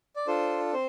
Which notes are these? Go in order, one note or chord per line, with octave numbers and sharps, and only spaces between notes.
D5
D4 F4 A4 C5
C4 C5